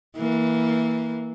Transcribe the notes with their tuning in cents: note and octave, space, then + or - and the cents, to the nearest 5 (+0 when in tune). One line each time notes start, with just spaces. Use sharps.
E3 -15 A#3 +0